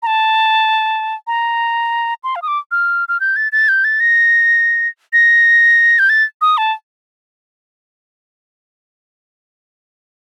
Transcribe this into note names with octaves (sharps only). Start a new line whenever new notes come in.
A#5
A5
A#5
C6
F5
D#6
D6
F6
F6
G6
A6
A6
G6
A6
A#6
A#6
G6
A6
D#6
A5